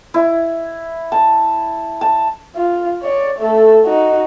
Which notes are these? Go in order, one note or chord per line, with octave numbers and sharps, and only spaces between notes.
E4
A5
A5
F4
C#5 D5
A3 A4
D#4 F#4